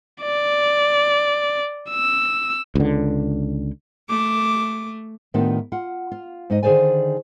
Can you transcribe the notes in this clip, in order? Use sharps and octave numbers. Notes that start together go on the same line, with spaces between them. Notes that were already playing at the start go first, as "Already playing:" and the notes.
D5
E6
C#2 D3
A3 D6
A2 D#3 B3 D4 F4 G4
F4 F#5
F4
G#2 D#4 D#5
D3 D#3 G#4 C5 D5 G#5